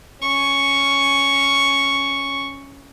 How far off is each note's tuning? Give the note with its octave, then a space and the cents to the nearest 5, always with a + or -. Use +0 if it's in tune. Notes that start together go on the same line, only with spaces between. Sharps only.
C#4 +0 C#6 +0